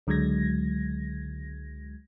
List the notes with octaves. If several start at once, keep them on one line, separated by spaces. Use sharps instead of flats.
C#2 D3 F#3 G#3 G#6 A#6